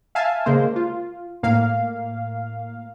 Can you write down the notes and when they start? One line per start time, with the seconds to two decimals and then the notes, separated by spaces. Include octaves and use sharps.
0.15 E5 F5 G#5 A5
0.46 C#3 G#3 A#3 C5
0.76 F4
1.43 A2 A#3 F5